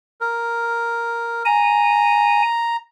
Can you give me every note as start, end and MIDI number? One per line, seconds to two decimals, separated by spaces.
0.21 1.43 70
1.45 2.42 80
1.45 2.76 82